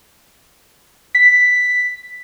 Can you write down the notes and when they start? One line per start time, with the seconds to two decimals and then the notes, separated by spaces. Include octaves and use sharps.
1.15 B6